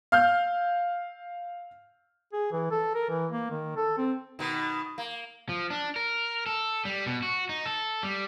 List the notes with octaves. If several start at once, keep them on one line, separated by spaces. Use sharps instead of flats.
F5 F6 G6
G#4
E3
A4
A#4
E3
A#3
D#3
A4
C4
B2 D#3
A#3
F3
D4
A#4
A4
G3
B2
F#4
D#4
A4
G3